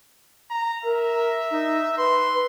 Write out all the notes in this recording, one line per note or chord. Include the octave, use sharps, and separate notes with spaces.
A#5
A#4 E5
D#4
B4 C6